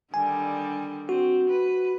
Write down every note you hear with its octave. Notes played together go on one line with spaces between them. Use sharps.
D3 D#3 G3 G#5
C4 F#4
B4